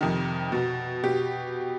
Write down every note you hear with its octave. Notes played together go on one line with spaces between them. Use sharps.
F2 C3 D#3
B2
B2 G4